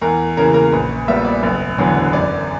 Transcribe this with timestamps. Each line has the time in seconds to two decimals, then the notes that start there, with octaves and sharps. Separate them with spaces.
0.01 E2 A#4
0.37 C#3 E3 A#3 A#4
0.54 A#4
0.72 A#1 B4
1.08 A#2 G3 B3 E5
1.25 D5
1.43 F#1
1.78 E2 D3 F#3 B3
2.13 F#2 D5